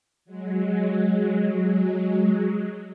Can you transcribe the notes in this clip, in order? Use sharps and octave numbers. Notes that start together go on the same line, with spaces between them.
F#3 G#3